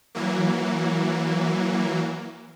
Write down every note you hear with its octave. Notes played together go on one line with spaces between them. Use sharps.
E3 F#3 A#3